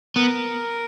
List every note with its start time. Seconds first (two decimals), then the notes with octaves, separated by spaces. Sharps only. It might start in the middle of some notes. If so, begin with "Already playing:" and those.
0.16 B3 A#4